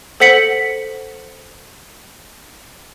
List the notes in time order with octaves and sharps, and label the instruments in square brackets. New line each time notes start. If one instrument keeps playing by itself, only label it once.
[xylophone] A4 C5 F#5 B6 C#7 F#7